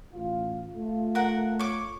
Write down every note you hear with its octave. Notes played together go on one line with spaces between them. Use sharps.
A1 F4
A3 F4
A#4 F#5
C#5 D6